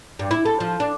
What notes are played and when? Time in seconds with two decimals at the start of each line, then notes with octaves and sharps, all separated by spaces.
0.19 G2
0.31 E4
0.45 A4
0.60 F3
0.80 D4